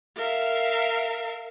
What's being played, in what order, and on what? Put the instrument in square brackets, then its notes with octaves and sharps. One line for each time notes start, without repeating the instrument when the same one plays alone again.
[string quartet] A#4 E5 F5